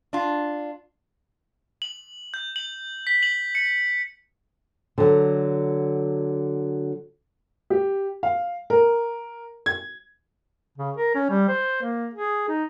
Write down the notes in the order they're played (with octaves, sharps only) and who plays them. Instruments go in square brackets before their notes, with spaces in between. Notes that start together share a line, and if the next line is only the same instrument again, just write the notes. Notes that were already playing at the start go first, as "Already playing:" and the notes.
[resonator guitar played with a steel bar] D4 F4
[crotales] F#7
G6
F#7
B6
F#7
C#7
[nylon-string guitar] D3 F#3
[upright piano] G4
F5
A#4
G#6
[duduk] C#3
A#4
C#4
G3
C5
A#3
G#4
D#4